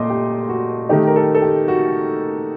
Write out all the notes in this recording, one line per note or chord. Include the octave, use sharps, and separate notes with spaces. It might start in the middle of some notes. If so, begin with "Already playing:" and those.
Already playing: A#2 A3 D#5 C6 D6
G4
F#4
D#3 A3 D#4 G4
A#4
A4
A4
G4
F#4